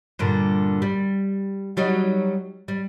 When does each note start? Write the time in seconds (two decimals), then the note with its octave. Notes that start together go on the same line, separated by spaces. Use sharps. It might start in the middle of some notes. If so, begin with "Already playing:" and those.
0.19 G2 A#2 D3
0.82 G3
1.77 F#3 G3 D#4
2.68 G3